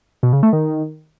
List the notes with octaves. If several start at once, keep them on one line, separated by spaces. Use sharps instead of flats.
B2
C#3
A3
D#3